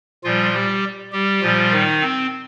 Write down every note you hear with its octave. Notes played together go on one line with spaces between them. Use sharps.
A#2 F3 G3 F4
G3 G4
G3 G4
A#2 F3 G3 F4
D#3 D#4
C4